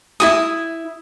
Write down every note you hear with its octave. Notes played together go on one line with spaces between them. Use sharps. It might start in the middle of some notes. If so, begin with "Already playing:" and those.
E4 F#4 D#6